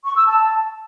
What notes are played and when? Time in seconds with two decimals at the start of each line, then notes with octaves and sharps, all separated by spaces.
0.05 C#6
0.16 E6
0.27 A5